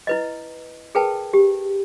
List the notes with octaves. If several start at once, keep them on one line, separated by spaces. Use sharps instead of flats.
E4 B4 D#5
G#4 A#4 B4 G5 A5
G4